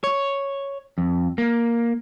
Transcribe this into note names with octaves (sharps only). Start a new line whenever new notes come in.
C#5
F2
A#3